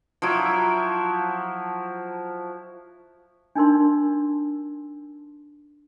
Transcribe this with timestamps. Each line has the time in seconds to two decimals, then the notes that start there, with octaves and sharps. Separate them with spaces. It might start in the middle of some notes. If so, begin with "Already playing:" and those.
0.22 F3 F#3 E4
3.55 D4 D#4 A#4 C6